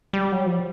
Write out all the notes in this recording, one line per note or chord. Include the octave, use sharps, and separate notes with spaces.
G3
F#3
F3